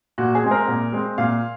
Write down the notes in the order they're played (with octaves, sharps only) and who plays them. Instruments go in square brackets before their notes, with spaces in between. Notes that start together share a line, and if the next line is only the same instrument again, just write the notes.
[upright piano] A#2 F#4
G#4
G#3 C4
A#4
A#2
G#3 C4
A#2 F5